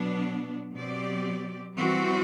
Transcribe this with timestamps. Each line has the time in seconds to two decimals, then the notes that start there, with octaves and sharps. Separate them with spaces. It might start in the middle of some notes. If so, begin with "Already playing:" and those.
Already playing: B2 F#3 B3 D4
0.75 B2 F#3 C4 G4 D5
1.76 E3 G3 C4 F#4